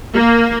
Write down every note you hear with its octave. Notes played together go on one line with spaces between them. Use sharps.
A#3